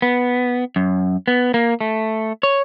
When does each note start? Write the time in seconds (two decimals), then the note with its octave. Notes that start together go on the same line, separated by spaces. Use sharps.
0.02 B3
0.76 F#2
1.28 B3
1.54 A#3
1.81 A3
2.43 C#5